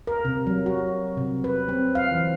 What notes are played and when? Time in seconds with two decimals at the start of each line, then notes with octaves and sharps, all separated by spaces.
0.07 A#4
0.25 C3
0.47 F#3
0.66 F#4
1.17 C3
1.44 B4
1.69 C4
1.95 F5
2.12 E3